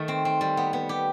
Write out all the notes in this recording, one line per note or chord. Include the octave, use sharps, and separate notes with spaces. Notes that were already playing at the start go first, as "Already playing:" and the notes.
Already playing: D#3 A3 D#4
C4
C4
G3
B3
B3
G4